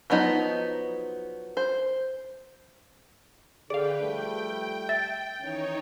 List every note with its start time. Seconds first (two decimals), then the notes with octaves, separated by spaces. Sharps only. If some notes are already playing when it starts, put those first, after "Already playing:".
0.10 F3 F#3 B3 D#4
1.57 C5
3.70 D3 G#4 B4 D5 F5 G5
4.01 F3 G3 A3 G5
4.89 E5 A6
5.41 D#3 E3 C#4 D#4 C#5